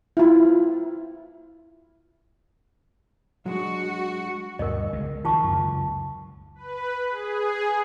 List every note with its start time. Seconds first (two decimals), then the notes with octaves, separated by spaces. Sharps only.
0.17 E4 F4
3.46 F#3 G#3 D4 F#4
4.59 D2 G2 B2 A#4 D#5
4.93 C#2 G#3
5.25 D#3 F3 F4 A5 C#6
5.44 C#2 F#2
6.55 B4
7.09 G#4